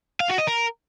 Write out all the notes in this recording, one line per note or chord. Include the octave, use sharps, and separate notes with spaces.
F5
F#4
D#5
A#4